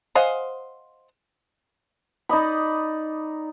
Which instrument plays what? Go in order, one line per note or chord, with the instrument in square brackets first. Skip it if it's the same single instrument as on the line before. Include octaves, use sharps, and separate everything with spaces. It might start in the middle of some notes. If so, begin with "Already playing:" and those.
[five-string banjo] C5 D#5 F5 F#5 G#5
[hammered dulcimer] D#4 D5 D#5 B5